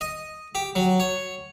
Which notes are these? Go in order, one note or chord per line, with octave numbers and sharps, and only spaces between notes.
D#5
G4
F#3
C#5